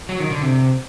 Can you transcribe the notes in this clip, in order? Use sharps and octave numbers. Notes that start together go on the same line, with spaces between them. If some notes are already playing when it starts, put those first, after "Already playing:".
F#3
D#3
D3
C3